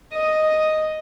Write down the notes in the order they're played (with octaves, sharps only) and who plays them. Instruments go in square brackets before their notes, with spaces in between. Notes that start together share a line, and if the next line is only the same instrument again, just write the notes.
[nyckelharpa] D#5